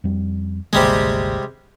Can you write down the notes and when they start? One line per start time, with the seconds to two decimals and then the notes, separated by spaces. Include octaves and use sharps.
0.04 F2 G3
0.73 G#1 D2 C3 G3 G#3 A#3